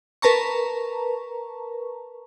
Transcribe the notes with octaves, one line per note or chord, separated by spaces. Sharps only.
A#4 B4 A5 A#5 C#6